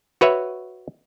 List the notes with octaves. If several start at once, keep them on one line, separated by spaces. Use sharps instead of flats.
F#4 B4 C#5 E5